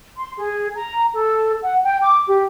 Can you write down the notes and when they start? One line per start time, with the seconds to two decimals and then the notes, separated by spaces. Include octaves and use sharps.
0.16 C6
0.39 G#4
0.76 A#5
1.13 A4
1.62 F#5
1.83 G5
2.02 D6
2.27 G4